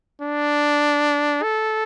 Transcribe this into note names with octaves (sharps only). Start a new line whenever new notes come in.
D4
A4